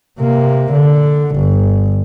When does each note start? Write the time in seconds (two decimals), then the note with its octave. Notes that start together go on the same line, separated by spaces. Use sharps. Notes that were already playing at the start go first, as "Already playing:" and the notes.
0.20 C3 A#3
0.73 D3
1.37 G1